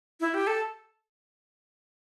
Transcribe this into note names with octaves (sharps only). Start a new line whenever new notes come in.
E4
G4
A4